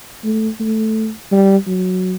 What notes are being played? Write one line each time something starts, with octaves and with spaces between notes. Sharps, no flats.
A3
A3
G3
F#3